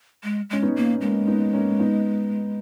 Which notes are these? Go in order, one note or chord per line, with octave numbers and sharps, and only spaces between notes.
G#3
G#3 C#4
B3 D#4
A#3
G#3 A#3 C#4
B3 D#4
A#3 C#4
B3 D#4